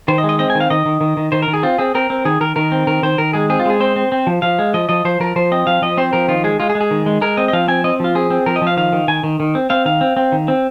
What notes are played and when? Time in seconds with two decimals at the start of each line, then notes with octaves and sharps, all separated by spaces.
0.08 D#3 C5
0.18 D#5
0.24 G#3
0.29 D#5
0.39 C4 D#5
0.50 G#5
0.55 D#3
0.60 F5
0.70 D#3 D#5
0.86 D#3
1.01 D#3
1.17 D#3
1.32 D#3 C5
1.42 A#4
1.48 D#3
1.53 G#4
1.63 C4 F4
1.78 C4 G#4
1.95 C4 A#4
2.10 C4
2.25 D#3 G#4
2.41 D#3 A#4
2.56 D#3 A#4
2.72 C4
2.87 D#3 A#4
3.03 D#3 C5
3.18 D#3 A#4
3.33 G#3 G#4
3.50 C4 G#4
3.60 F4
3.66 G#3 G#4
3.80 C4 C5
3.96 C4
4.12 C4
4.27 F3
4.42 F3 F5
4.59 G#3
4.74 F3 D#5
4.89 F3 D#5
5.05 F3 C5
5.20 F3 A#4
5.36 F3 C5
5.52 C4 D#5
5.67 F3 F5
5.82 F3 D#5
5.97 C4 C5
6.13 F3 A#4
6.29 D#3 F4
6.44 G#3 G#4
6.60 G#3 F4
6.70 G#4
6.75 G#3
6.81 G#4
6.91 D#3
7.06 G#3
7.21 G#3 A#4
7.37 C4 D#5
7.48 D#5
7.53 F3 F5
7.68 C4 G#5
7.84 C4 D#5
8.00 F3 F4
8.15 C4 G#4
8.30 C4
8.46 F3 A#4
8.56 D#5
8.62 F3
8.67 F5
8.77 D#3 F5
8.93 D#3
9.08 D#3 G#5
9.23 D#3
9.40 D#3
9.55 C4
9.70 C4 F5
9.85 D#3 F5
10.01 C4
10.17 C4
10.32 D#3
10.48 C4